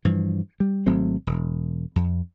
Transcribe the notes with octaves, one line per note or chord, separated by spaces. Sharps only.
G2 E3 F3
G3
G#1 F#3 A3 C4
E1
F2